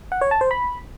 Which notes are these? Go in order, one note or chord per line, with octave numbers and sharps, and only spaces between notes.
F#5
C#5
A5
C5
B5